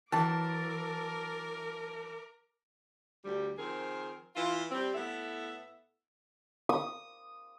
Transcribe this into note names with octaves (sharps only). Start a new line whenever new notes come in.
E3 F#3 A#4 A5 D6
D2 G3
D#3 F3 C4 G#4 A#4
E3 E4 F4
G3 C4
A2 B3 E4 A4 E5
D#6